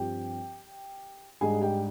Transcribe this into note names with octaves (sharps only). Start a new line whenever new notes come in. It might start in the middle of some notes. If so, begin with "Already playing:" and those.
Already playing: G2 F3 C4 G4 G5
G#2 G3 D4 G#4 G#5
G4 G5